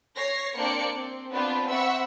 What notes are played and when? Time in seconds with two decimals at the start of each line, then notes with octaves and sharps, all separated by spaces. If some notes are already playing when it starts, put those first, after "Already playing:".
0.14 C#5 A#6 C7
0.56 A#3 C4 D4 C5 D5 C#7
0.94 C4
1.32 B3 C4 D4 F4 B4 C5
1.69 C4 E5 F#5 B5 C#6 E6